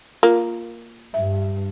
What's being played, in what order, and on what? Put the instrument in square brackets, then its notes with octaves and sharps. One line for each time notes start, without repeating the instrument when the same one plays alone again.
[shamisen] A#3 [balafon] F4
[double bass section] G2 [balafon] E5